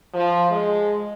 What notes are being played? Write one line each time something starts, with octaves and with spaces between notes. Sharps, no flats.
F3
G#3